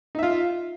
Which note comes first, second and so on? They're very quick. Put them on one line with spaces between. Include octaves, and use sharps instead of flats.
D#4 E5 F4